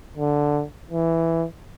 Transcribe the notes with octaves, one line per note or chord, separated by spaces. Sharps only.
D3
E3